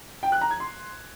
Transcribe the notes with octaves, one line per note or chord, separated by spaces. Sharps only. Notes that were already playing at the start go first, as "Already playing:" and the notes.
G5
F#6
A#5
G#6
C6